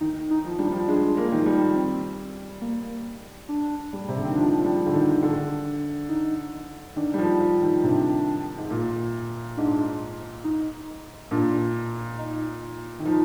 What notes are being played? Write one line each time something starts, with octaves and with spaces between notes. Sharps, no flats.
D#3 D#4
D#4
F3
G3 D4
F3
G#3 D4
A#3
D#3
F3
G3
C4
A#3
D4
G3
C3
D3
D#3 C4
F3 D4
F3
G3
D3
D#3
D3 D4
D#4
D#3 D4
G3
F3
F3
D#3
C3 D4
G#2
A#2
G#2 D4
D#4
A#2 D4
D#4
D#3
F3 D#4